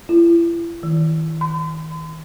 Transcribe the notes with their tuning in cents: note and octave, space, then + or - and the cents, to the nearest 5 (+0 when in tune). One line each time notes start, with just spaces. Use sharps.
E4 +40
D#3 +40
C6 -45